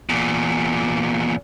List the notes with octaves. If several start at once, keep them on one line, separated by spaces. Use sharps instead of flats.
E2 A#2